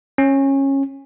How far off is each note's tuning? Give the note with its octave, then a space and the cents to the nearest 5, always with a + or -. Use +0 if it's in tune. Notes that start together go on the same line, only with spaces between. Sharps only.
C#4 -20